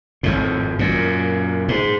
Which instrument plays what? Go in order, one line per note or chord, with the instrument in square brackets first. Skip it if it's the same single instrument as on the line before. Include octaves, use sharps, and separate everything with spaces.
[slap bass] G#1 F2 A2
F#2 A#2
G#2